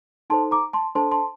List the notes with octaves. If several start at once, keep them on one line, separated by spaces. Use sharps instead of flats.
D#4 A4 C5 A5 C6
A#5 D6
A5 C6
D4 A4 C5 A5 C6
A5 C6